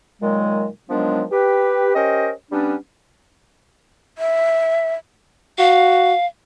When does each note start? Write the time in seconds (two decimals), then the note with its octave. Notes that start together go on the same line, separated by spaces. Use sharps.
0.22 A#2 D#3 F#3 G#3
0.90 D#3 F3 F#3 G#3 B3 D4
1.31 G4 B4
1.95 C#4 G4 A#4 C5 D#5
2.51 G3 B3 C#4 D4
4.18 E5
5.58 F#4 F5